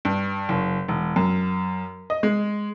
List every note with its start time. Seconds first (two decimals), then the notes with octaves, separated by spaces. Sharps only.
0.05 G2
0.49 F#1
0.88 E1
1.16 F#2
2.10 D#5
2.23 G#3